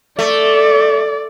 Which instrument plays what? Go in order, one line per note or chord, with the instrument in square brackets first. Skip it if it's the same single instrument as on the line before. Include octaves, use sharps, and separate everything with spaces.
[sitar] A3 [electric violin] D5